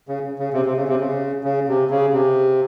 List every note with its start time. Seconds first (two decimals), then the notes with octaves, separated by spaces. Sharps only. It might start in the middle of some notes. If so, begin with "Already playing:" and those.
0.08 C#3
0.39 C#3
0.53 C3
0.65 C3
0.76 C#3
0.87 C3
1.00 C#3
1.44 C#3
1.68 C3
1.90 C#3
2.13 C3